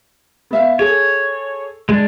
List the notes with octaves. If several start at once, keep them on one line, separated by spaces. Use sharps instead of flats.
B3 E5 F5
G#4 A4 C#5
G#3 D4